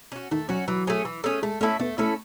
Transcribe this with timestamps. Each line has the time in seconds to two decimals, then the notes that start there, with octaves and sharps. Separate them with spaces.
0.12 C#4 F#4
0.31 D#3 A3
0.49 F#3 C#4 F#4
0.68 E3 F#3
0.87 A3 C#4 G#4
1.05 E3
1.24 A3 C#4 G#4
1.42 G#3 A3
1.61 A3 C#4 E4 A4
1.80 A3 B3
1.98 A3 C#4 E4 A4